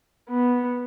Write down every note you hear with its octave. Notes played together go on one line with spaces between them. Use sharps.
B3